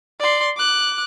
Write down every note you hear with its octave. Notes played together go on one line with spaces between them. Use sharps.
D5 C6
D6 F#6